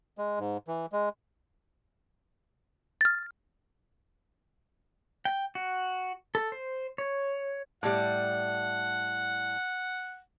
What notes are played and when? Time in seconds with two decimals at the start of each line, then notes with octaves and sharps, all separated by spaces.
0.18 G#3
0.39 G#2
0.68 E3
0.92 G#3
3.01 F6 A6
5.25 G5
5.55 F#4
6.35 A4
6.52 C5
6.98 C#5
7.83 A2 G3 F#5